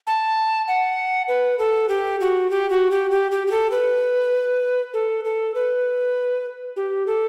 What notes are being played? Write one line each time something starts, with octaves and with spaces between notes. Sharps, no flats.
A5
F#5
B4
A4
G4
F#4
G4
F#4
G4
G4
G4
G4
A4
B4
A4
A4
B4
G4
A4